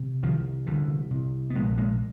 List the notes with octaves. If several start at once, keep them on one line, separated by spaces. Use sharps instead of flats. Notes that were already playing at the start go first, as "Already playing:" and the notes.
Already playing: C3
C2 D#3 F3
C2 D3 E3
C3
B3
A#1 G#3 A#3
G#3 A#3